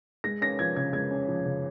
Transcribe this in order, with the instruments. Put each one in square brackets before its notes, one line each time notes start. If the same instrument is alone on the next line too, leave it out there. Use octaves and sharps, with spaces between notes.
[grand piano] G#3 A#6
C#4 A#6
F3 G#6
C#3 G#6
G#3 G#6
C#4
F3
C#3